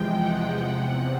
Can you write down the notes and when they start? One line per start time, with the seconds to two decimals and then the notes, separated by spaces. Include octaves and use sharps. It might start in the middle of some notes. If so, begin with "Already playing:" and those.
Already playing: E2 C3 F3 G#3 G5
0.15 F#5
0.59 E2 C3 F3 F#5